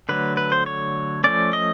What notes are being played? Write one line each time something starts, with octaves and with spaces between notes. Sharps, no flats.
D3 F#3 A3 B4
B4
C5
C#5
F3 A3 C#4 D5
D#5